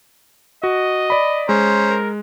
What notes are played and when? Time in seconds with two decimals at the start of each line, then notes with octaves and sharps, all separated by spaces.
0.63 F#4 D#5
1.10 D5 B5
1.49 G#3 C#4 C5 A#5
1.89 A#4